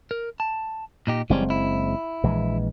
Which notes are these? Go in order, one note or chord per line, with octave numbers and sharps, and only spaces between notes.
A#4
A5
A#2 D#4 G4
F#1 E3 G3 G#3 C4 C#4
E4
A#1 E3 G#3